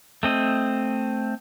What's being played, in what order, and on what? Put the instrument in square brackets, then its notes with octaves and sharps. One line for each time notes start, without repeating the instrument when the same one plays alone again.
[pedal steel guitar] A3 C4 D#5